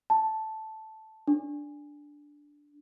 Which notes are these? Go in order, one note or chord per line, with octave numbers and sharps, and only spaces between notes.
A5
D4